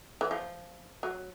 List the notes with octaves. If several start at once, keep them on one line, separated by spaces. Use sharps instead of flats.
E3
F3
F#3